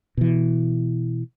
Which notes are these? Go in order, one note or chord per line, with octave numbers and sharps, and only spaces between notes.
B2 E3